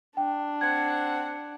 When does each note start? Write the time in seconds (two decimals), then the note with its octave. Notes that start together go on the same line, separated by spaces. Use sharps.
0.17 D4 G5
0.61 C4 F#5 G#6